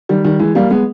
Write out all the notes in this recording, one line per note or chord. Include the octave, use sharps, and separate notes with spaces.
D#3 G3
D#3 G3
E3 G#3
G3 A#3
G#3 B3